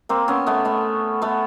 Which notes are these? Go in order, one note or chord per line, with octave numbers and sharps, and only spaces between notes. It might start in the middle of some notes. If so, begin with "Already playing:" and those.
A#3 C4
B3 C#4
A3 B3
A3 B3
A3 B3